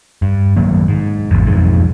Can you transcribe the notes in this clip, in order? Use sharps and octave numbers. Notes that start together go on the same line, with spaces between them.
G2
B1 D#3 F#3 A#3
G#2
G#1 E2
B1 F2 G#2